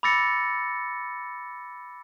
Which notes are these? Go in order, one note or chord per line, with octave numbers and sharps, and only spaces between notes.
B5 D6 E6 A6 A#6 C#7